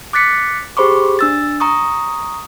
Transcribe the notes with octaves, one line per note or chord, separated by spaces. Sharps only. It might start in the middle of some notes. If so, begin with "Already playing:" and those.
D6 F#6 A6 B6 C#7
G4 G#4 C5 B5 C#6 D6
D4 E6 A6
A#5 C#6 D#6